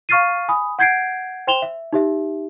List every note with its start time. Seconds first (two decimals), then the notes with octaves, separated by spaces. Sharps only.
0.09 F5 C#6 F6 A6 C7 D#7
0.48 G#5 B5 D#6
0.79 F#5 G6 G#6 C7 D7
1.47 C5 G5 C6 E7 F7 G7
1.62 E5
1.93 D#4 G4 E5